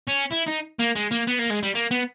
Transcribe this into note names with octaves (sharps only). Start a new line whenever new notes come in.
C#4
E4
D#4
A#3
G#3
A#3
B3
A#3
G#3
G3
A#3
B3